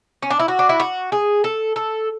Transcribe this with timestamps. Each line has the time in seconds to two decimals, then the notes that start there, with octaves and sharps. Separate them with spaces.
0.22 C#4
0.30 D4
0.39 E4
0.48 F#4
0.59 D4
0.69 E4
0.80 F#4
1.12 G#4
1.44 A4
1.76 A4